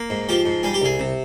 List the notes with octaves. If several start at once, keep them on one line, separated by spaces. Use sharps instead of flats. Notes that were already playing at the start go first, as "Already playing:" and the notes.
Already playing: A#3
G#2
F3 G4
G#2
G3 G#4
G4
C2 G#4
C3